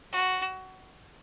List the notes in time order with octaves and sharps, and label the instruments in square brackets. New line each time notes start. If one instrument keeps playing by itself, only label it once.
[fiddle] F#4